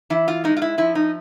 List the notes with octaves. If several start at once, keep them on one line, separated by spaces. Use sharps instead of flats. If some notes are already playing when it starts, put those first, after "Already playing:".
E3 E4
F4
G#3 D#4
F4
E4
F3 E4
D#4